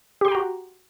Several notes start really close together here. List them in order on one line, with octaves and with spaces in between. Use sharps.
G4 C6 G5 A#5 F#4